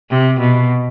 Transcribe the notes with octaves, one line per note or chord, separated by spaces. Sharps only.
C3
B2